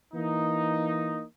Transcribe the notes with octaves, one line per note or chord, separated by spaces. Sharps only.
E3 A#3 D#4